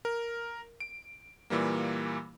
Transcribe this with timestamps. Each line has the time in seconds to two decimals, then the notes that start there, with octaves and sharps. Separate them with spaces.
0.05 A#4
0.80 D7
1.50 A#2 E3 G3 A#3